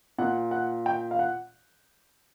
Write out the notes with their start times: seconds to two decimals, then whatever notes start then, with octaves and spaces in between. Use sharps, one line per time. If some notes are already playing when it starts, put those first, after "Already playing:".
0.18 A#2 F#5
0.51 F#5
0.86 G5
1.11 F5
1.19 F#5